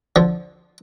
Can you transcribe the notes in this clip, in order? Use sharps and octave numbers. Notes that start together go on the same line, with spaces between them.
D3 F3